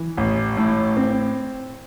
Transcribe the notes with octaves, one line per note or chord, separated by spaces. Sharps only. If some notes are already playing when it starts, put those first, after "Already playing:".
Already playing: E3
A1
A2
C4